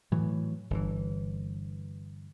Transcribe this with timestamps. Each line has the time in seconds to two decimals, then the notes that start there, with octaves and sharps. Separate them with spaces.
0.11 A2 E3 F#3
0.70 G1 E3